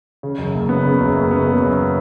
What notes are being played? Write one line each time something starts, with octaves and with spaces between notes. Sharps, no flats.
C#3
F#2
F#1
B3
C#3
F#2
F#1
B3
C#3
F#2